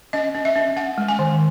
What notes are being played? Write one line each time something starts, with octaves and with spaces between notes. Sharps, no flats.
C#4 D#5
C#4
E5
C#4
C#4 F#5
G#3
G#5
D#3